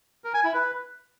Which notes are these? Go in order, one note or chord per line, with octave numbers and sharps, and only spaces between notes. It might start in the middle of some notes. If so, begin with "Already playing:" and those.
A#4
G#5
E4
B4